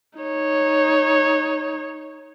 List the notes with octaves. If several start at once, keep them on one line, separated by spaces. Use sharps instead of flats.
D#4 C#5